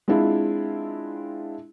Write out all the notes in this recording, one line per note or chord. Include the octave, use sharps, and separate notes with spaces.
G#3 C4 D4 E4 F4